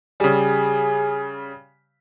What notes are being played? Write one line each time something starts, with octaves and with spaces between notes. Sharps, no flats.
C#3 G3 G#4